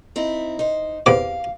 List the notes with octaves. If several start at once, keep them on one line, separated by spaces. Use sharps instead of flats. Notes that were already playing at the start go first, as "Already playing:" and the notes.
C4 D#4 E4
D#4 C5
E2 C3 F5 D6